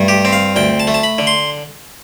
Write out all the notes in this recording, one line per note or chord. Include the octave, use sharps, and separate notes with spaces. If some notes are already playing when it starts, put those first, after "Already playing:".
Already playing: G2 A3
G4
C4
F5
D2 G5
A5
A3
A5
B5
D3
C6